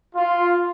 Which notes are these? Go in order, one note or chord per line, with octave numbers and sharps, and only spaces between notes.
F4